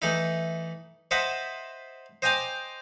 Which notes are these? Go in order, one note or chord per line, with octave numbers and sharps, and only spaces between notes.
E3 A3 D#4 E4
C5 D#5 E5 F#5 A5 B5
C5 D#5 G5 G#5 A#5 D6